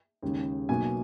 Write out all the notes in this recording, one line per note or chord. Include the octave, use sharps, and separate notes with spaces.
D#2 C#3 G#3
B1 B2 A#3 G#5